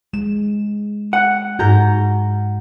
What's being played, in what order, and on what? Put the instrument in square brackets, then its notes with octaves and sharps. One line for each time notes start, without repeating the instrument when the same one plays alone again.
[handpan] G#3 [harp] E7
[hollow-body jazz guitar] F#5
[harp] G#2 A#5 G6 [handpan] F#4